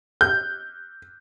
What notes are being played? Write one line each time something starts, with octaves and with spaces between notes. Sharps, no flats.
G6